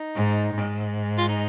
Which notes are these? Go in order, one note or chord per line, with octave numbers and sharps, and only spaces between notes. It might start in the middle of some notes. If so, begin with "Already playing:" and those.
Already playing: D#4
G#2
G#2
F4
D#4